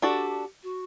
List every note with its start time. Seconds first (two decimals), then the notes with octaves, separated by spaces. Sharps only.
0.02 D4 F#4 G4 A4 D5
0.63 F#4